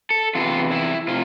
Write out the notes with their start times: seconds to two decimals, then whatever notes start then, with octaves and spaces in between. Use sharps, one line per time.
0.10 A4
0.35 E2 C3 E3 F4
0.71 E4
1.08 C3 F4